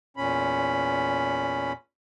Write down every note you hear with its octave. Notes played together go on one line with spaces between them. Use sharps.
E2 A#2 C#4 B5